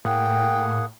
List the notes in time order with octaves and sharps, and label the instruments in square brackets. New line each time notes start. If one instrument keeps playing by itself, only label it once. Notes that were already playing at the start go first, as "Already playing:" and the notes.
[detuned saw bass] A2 [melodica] A#3 G#4 F#5 [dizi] G5